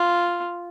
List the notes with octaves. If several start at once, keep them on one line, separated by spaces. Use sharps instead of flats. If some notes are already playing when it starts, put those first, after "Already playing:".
Already playing: F4